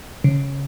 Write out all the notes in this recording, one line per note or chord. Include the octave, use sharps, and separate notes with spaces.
C#3